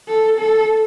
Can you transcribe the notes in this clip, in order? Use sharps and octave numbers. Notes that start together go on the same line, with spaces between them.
A4
A4